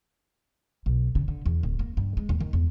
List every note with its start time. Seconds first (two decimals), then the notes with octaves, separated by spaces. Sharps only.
0.86 B1
1.15 C#3
1.28 D3
1.46 E2
1.63 D1
1.79 A#3
1.97 G2
2.17 G#3
2.29 D#2
2.40 D#3
2.53 E2